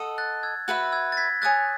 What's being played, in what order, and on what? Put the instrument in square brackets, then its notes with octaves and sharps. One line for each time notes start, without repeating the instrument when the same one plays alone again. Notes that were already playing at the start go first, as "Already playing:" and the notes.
Already playing: [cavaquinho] A4 D#5 F#5
[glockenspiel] F#6 A6
E6 G#6
[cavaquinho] F#4 B4 E5 B5 [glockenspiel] F#6
[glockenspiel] E6 G#6
A6
G#6 B6
[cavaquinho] C#5 G#5 D#6 [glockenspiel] F#6 A6